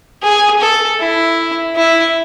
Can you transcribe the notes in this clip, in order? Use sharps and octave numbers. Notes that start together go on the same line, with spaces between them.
G#4
A4
E4
E4